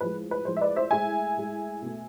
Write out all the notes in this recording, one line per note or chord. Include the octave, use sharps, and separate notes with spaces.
A2 F3 G#3 B4
B4
A2 F3 G#3 C5
E5
B4 D5
C5 E5
A2 G#3 E5 G#5
A2 G#3
B2 A3